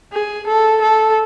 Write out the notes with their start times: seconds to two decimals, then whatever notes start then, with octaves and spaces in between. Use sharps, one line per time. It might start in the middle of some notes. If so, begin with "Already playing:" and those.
0.13 G#4
0.47 A4
0.82 A4